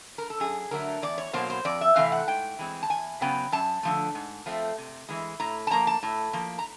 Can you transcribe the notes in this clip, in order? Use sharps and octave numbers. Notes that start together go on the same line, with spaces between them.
A#4
A4
F#2 G#4
D3 F#3 A3 A#4
E2 D5
C#5
B2 F#3 A#3 C5
C5
F2 D5
E5
C3 E3 A3 C4 F5
F#5
G#2 G5
E3 G#3 C4
A5
E2 G#5
C#3 F#3 B3 G5
F#2 A5
D3 F3 A3
G#2
F3 A3 C4
C3
E3 G#3
A2 A#5
A5
F3 A#3 A#5
A5
A2
F3 A#3
A#5